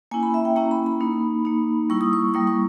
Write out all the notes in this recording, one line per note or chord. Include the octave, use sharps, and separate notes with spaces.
A#3 C#4 E4 G#5
B5
E5
G5
A#3 C#4 E4 A#5
B5
B5
A#3 D#4
A#3 D#4
G3 A#3 E4 C#6
D#6
C#6
G3 A#3 E4 D#6
C#6